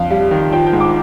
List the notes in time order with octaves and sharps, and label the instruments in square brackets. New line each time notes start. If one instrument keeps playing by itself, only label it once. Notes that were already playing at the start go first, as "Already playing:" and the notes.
Already playing: [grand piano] F2 [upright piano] F5
[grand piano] G3 [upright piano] F5
[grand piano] D#3
[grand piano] F3 [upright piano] G5
[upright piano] G5
[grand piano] G#2
[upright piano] D6